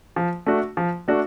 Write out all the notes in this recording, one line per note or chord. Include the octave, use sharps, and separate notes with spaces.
F3
A3 D4 F#4
F3
A3 D4 F#4